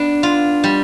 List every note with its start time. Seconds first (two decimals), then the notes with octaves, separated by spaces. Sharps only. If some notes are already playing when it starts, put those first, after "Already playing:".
Already playing: B3 D4
0.23 F4
0.64 G3